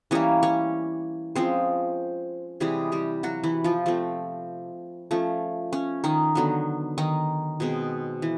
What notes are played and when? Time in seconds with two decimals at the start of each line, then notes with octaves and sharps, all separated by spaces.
0.11 E3 G3 A#3 C#4 C#5
0.43 C#4 C#5
1.36 F3 G#3 C4 C#4 C5
2.60 C3 E3 G3 G#3 G#4
2.92 G3 G4
3.23 F#3 F#4
3.44 E3 E4
3.64 F3 F4
3.86 F3 A3 C4
5.11 F3 A3 C#4
5.73 C#4
6.04 D#3 D#4
6.35 D3 F#3 B3
6.98 D#3 D#4
7.60 B2 G#3 C4
8.22 E3